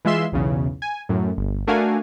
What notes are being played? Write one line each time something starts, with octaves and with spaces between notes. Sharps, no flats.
E3 G#3 F4 E5 C6 E7
B1 E2 C#3
G#5
F#2 A2
G1
A3 D4 F#4 A#4 F5 G#5